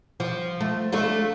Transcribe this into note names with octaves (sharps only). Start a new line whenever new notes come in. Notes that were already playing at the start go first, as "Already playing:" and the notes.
F3
A3
A3 D4 F4